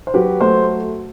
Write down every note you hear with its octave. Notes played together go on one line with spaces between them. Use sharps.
C5
F#3 G4 B4
A3 A4 C5